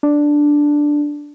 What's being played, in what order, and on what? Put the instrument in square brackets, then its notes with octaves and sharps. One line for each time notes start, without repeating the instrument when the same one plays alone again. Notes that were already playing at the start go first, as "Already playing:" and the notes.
[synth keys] D4